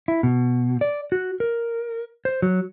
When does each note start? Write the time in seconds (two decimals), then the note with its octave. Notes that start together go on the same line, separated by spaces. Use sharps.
0.08 E4
0.23 B2
0.81 D5
1.12 F#4
1.40 A#4
2.25 C5
2.42 F#3